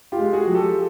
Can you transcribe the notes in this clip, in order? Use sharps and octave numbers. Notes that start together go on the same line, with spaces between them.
F4 G4
G#3
F#4 G#4
F3
G4 A4